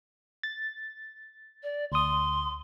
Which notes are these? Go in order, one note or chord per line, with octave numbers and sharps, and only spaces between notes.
A6
D5
D2 C6 D#6